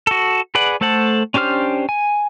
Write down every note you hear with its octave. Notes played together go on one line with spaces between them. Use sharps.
F#4 A4
G#4 B4 D5 F#5
A3 A4 C5 F#5 A5
C#4 D4 G4 C5 F6
G#5